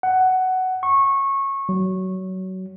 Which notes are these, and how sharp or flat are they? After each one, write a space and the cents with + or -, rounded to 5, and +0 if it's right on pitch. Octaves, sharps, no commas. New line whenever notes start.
F#5 +10
C#6 -20
F#3 +20